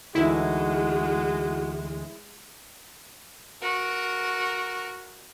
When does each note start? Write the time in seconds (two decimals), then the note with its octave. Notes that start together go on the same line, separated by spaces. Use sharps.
0.15 D2 E3 G#3 D#4 E4 F#4
3.61 F#4 A#4